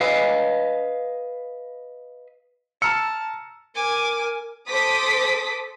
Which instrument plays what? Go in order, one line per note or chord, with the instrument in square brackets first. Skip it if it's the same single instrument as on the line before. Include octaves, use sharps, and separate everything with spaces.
[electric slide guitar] B4 D#5 F5
[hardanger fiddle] A5 [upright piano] A#5 F6 [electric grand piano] E6 C#7
[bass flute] A#4 [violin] G#5 D6
[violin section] A4 C5 D6 D#6 B6